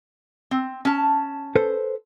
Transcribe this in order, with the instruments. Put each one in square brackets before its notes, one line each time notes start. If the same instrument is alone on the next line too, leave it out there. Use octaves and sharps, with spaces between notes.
[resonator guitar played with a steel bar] C4
C#4 A5
[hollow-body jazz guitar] A4 B4 C5